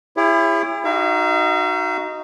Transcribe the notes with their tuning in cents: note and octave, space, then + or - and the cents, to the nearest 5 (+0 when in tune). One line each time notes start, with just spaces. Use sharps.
E4 +20 G#4 -45 C#5 +0
D#4 +0 F#4 +0 F5 -45